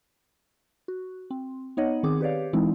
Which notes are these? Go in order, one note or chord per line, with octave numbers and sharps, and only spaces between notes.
F#4
C4
B3 D#4 C#5 D#5 F#5
D#3 C4 G#4 D6
G4 B4 C#5 D5 F5
E3 G#3 C4 D#4 E4